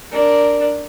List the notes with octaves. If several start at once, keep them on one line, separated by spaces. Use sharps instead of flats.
D4 A#4